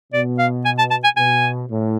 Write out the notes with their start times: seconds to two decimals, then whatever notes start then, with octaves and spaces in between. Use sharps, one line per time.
0.13 B2 D5
0.39 F5
0.65 G#5
0.78 A5
0.90 A5
1.04 G#5
1.17 B2 G#5
1.69 A2